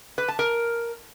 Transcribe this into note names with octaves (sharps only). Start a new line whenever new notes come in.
B4
A5
A#4